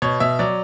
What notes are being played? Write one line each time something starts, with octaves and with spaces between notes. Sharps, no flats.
B2 C#5
B2 E5
F#3 D5